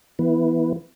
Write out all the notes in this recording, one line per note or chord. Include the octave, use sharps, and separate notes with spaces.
E3 B3